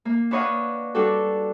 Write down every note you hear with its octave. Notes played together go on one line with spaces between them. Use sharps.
A#3
D4 B4 C#5 D#5 F5 F#5
G3 D4 F#4 A4